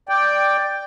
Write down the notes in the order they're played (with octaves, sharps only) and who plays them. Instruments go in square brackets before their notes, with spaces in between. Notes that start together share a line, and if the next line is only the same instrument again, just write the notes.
[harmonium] D5 G5